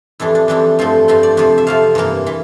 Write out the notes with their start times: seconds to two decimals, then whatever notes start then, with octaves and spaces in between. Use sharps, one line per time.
0.20 F2 E3 G3 D4 E4
0.35 D4
0.48 F2 E3 G3 D4 E4
0.79 G2 F3 A3 C4
1.08 G2 F3 A3 C4
1.23 D5
1.37 F2 C3 F3
1.58 E5
1.67 F2 C3 F3 F5
1.95 G2 E3 A#3
2.27 E3